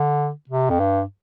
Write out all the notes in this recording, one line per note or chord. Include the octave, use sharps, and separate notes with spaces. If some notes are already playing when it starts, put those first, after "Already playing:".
Already playing: D3
C3
F2
G2